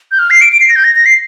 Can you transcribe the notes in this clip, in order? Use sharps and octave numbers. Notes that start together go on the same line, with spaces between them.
G6
F6
C7
D7
D7
C7
A#6
G6
A#6
A#6
C7